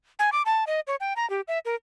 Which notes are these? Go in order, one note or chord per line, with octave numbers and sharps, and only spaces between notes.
G#5
D6
A5
D#5
C#5
G5
A#5
G4
E5
A#4